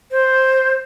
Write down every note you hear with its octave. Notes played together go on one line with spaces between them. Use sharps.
C5